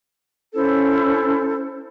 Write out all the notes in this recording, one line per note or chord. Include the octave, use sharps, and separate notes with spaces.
C#4 E4 A4 C5